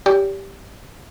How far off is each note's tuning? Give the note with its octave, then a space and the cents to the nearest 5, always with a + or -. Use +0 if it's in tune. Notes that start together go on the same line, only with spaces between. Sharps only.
G4 +0 D5 -45